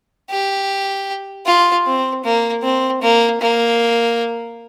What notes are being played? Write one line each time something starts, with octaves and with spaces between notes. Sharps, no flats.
G4
F4
C4
A#3
C4
A#3
A#3